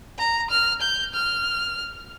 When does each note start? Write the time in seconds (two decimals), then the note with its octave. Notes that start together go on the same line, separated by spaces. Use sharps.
0.18 A#5
0.50 F6
0.81 G6
1.14 F6